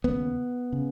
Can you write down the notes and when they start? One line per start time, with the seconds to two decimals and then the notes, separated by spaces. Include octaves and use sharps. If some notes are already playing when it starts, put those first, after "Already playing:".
0.04 D#2 C#3 B3
0.72 C#3